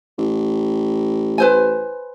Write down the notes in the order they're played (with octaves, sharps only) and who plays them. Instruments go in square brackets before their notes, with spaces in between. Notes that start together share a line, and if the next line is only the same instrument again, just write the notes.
[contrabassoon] A1
[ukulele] B4 C5 G#5